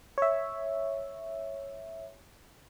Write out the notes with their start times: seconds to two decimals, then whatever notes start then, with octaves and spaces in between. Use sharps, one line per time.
0.18 C#5 E5